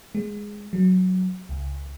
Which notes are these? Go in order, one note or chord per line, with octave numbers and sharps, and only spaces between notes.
G#3
F#3
C#2